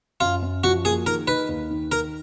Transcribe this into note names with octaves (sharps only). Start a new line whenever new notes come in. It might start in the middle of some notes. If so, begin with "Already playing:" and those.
F#2 F4
F#2
F3 F#4
A#3 G#4
D#3 A#4
D#4 B4
D#2
D#3
D#3 A#4